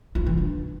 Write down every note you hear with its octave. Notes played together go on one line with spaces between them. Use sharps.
F4
E3
D4